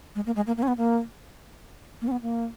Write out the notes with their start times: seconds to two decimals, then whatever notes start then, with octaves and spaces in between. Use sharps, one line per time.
0.15 G#3
0.26 A#3
0.36 G#3
0.47 A#3
0.57 A#3
0.63 C#4
0.68 B3
0.77 A#3
2.02 A#3
2.08 C#4
2.12 B3
2.22 A#3